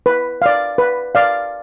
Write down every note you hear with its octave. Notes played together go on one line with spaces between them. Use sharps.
B4
D5 F5
B4
D5 F5